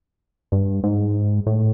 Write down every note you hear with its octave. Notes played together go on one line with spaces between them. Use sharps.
G2
G#2
A2